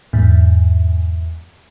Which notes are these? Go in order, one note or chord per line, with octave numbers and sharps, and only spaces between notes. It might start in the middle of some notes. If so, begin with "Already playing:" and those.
E2 G#2